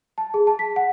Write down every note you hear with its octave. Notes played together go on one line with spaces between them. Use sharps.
A5
G#4
A5
B6
F#5